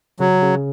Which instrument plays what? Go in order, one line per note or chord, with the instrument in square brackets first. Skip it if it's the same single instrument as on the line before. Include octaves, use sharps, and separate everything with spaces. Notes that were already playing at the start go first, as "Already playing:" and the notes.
[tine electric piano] C#3 [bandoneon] F#3
[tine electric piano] C#3